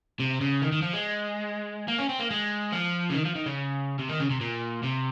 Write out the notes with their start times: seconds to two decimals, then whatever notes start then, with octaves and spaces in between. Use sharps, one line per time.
0.20 C3
0.41 C#3
0.62 D#3
0.72 D#3
0.82 F3
0.93 G#3
1.88 A#3
1.98 C#4
2.09 C4
2.20 A#3
2.30 G#3
2.73 F3
3.10 C#3
3.15 D#3
3.25 F3
3.36 D#3
3.46 C#3
3.99 C3
4.09 D#3
4.20 C#3
4.30 C3
4.41 A#2
4.83 C3